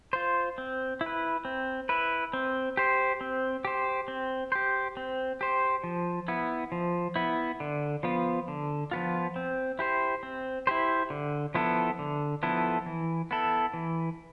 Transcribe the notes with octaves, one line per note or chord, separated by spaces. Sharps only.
F4 C5
C4
E4
B4
C4
E4 B4
C4
G4 C5
C4
G4 C5
C4
G4 C5
C4
G4 C5
F3
B3 E4
F3
B3 E4
D3
F3 B3 F4
D3
F3 B3 F4
C4
E4 G4 C5
C4
E4 G4 C5
D3
F3 B3 E4 A4
D3
F3 B3 E4 A4
E3
B3 E4 A4
E3